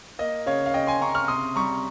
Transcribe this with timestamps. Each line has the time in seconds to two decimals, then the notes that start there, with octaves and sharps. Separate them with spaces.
0.19 A#3 D#5
0.46 C#3 C#5 F5
0.66 F5
0.74 C#3 D#5 G5
0.87 G#5 C6
1.01 C#3 A#5 C#6
1.15 C#6 F6
1.28 C3 C6 D#6
1.55 G3 A#5 C#6